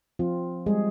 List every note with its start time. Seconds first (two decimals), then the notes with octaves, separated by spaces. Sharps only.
0.19 F3 C4 F4
0.66 G3 G#3 G#4